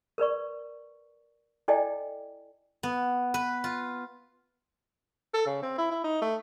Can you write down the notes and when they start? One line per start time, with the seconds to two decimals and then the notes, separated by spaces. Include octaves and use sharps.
0.18 A#4 B4 D5 C#6
1.68 E4 A4 D5 D#5 G5 G#5
2.83 B3
3.34 B4
3.64 F4
5.34 A4
5.46 C#3
5.62 C4
5.78 E4
5.91 E4
6.04 D#4
6.22 A3